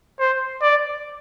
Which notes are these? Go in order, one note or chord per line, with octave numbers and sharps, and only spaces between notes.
C5
D5